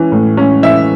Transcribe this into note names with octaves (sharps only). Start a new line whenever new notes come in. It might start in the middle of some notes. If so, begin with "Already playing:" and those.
Already playing: E3 C#4
A2
C#4
E3 E5